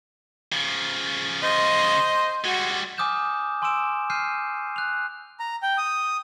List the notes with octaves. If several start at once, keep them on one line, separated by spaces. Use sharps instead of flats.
C#3 F3
C5 D#5
G3 G#3 F#4
G#5 D6 D#6 F6 G6 E7
G#5 C6 D6 E6 D7 E7
F6 G6 C7 D#7
F#6 F7
A#5
G5
D#6